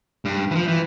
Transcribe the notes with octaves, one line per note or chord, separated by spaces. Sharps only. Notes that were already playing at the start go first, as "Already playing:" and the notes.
G2
E3 F3
E3